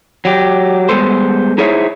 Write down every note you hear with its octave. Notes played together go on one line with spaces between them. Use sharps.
F#3 G4
G3 G#3 B3 A4 C5
D#4 E4 G#4 C5 C#5 E5